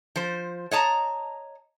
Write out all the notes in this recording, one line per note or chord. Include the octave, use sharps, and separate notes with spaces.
F3 C5
C#5 D#5 A5 A#5